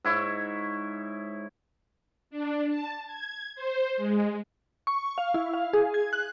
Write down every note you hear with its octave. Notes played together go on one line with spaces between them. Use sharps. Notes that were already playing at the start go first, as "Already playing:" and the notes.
G#2 E4 C#5
D4
A5
G#6
C5
G#3
C#6
F5
E4
F5
G#4
G#6
F#6